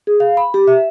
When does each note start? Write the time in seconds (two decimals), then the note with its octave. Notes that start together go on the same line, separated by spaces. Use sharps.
0.07 G#4
0.20 F5
0.37 B5
0.54 G4
0.67 E5